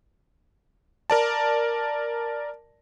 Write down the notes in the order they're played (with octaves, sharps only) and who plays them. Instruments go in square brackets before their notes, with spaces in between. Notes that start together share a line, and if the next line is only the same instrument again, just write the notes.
[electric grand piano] A#4 D5 A5